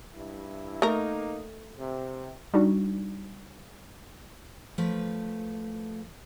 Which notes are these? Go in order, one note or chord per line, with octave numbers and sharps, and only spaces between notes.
G2 E4
A3 A#3 D#4 A#4
C3
G3 D4 D#4 F#4
F3 A3 B4